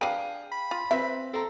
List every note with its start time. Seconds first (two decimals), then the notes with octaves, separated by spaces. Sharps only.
0.01 D4 G#4 B4 F5 G5 D#7
0.52 B5
0.71 F4
0.91 C4 B4 E5 B6
1.33 C4 A4 A#5